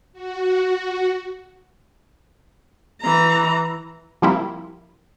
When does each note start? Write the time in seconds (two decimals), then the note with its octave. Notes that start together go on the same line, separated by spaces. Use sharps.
0.13 F#4
3.01 E3 A#5
4.22 F3 G3 A#3 C4 E4